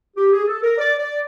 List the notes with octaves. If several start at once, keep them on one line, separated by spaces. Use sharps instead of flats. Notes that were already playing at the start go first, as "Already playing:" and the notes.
G4
G#4
A4
A#4
D5
D5